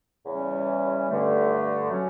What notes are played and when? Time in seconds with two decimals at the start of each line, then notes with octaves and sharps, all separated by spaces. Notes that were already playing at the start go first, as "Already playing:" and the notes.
0.25 E2 C#3 E3 G3 C#4
1.08 G2 D3 A3
1.91 F#3 C#4